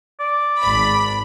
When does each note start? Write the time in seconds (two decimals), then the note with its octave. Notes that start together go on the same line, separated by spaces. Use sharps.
0.20 D5
0.62 G#1 B5